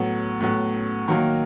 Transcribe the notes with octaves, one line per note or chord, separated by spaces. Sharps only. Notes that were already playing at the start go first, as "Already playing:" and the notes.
Already playing: A2 F#3 B3
A2 F#3 B3
D#3 F#3 A#3